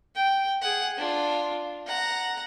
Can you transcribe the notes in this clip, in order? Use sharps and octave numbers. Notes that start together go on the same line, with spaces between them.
G5
G#4 F#5
D4 F4
F#5 A#5